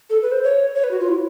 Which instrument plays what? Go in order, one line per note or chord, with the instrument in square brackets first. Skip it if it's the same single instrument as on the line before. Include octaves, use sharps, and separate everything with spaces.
[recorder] A4
B4
C5
C#5
C#5
B4
F#4
F4
E4